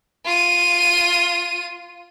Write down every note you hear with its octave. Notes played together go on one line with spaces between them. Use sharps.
F4 D#7